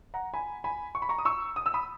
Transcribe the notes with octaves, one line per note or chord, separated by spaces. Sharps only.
F#5 A#5
G#5 B5
G#5 B5
C#6
B5
A#5 C#6
D#6
C#6 E6
D#6
E6
B5 D#6